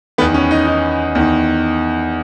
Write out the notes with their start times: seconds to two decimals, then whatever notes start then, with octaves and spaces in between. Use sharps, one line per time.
0.18 D#3 B3
0.21 E2
0.34 C#4
0.51 D#4
0.67 D#4
1.15 E2 D#3